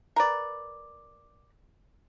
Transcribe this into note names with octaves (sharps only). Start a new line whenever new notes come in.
A#4 B4 D5